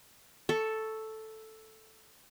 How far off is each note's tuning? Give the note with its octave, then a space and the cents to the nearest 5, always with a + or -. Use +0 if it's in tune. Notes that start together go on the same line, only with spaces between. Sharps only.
A4 +0 C#6 +0